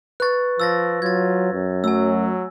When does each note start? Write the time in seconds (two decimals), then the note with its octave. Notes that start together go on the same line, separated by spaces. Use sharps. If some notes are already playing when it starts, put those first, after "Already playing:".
0.20 B4 C#6 F#6 A6
0.60 F3 E6 A6 A#6
1.02 F#3 F4 G#6 A6
1.53 F#2
1.84 F#3 A3 G#5 E6